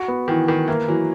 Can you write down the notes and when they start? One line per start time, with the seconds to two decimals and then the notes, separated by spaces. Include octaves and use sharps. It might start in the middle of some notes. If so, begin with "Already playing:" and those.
Already playing: F#4
0.08 B3
0.28 D#3 E3
0.48 D#3 B4
0.68 E3 A#3
0.88 E3 F#3